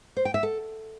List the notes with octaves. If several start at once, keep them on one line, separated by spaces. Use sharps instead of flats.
C5
G5
E5
A4